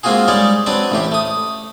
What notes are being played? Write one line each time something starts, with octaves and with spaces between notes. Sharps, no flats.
G#3 A#3 C4 F4 F#4 G#4
G3 G#3 D#4 C#5 D5
F#3 C4 D4 B4 D5
A1 A2 G4
A3 D#6